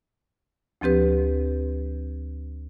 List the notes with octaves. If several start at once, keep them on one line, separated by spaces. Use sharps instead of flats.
D2 F3 C4 G4 B4